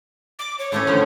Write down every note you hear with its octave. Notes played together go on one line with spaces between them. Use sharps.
D6
C#5
A2 A3 C#4 C#5
D3 D#3 F3